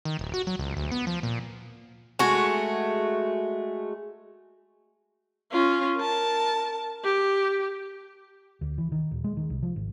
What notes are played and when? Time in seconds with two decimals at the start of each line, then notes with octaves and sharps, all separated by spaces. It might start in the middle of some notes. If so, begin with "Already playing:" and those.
0.05 D#3
0.19 D1
0.34 F#4
0.47 F#3
0.59 C#2
0.76 D2
0.92 B3
1.07 F3
1.23 A#2
2.19 G#3 A3 F#4
5.52 C#4 F4
5.97 A#4 A5
7.04 G4
8.61 D2
8.78 E3
8.92 D#3
9.11 D#1
9.24 G#3
9.37 D#3
9.50 C2
9.62 F3
9.76 G#1